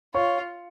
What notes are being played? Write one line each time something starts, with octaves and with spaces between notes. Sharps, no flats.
F4 C#5 C#6